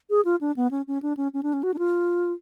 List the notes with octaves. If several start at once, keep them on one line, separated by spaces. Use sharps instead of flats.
G#4
F4
D4
B3
C#4
C#4
D4
C#4
C#4
D4
C#4
F#4
D4
F4